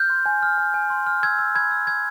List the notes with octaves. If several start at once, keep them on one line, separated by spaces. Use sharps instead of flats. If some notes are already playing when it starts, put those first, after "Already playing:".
Already playing: F6 G6
C6
G#5
F6
G#5
G#5
C6
F6
E6 G#6
E6
B5 G#6
E6
E6 G#6